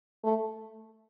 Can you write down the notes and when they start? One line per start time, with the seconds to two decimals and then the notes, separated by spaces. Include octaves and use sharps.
0.24 A3